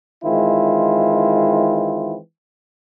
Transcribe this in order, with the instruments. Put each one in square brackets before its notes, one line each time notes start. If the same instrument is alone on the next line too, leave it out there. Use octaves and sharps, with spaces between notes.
[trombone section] D#3 E3 G#3 C4 E4 F4